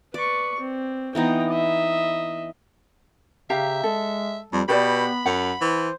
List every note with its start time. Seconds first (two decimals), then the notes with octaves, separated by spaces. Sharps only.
0.14 B4 D5 C#6
0.60 C4
1.15 E3 B3 D#4 G5 A#5
1.49 D#5 E5
3.50 C#3 G4 E5 F5 A#5
3.84 G#3 A4
4.52 F2 G3
4.69 B2 B3 G4 B4 D5 B5
5.26 F#2 F#5
5.61 E3 C5